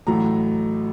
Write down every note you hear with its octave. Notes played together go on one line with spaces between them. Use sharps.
A1 A2 F#3 A3 A#5